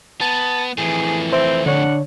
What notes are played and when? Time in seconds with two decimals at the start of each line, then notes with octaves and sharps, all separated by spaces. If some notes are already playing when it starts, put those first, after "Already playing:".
0.21 B3 A5
0.78 F2 A2 E3 G#4
1.33 C4 C5 E5
1.66 D3 D4 C#5 F#5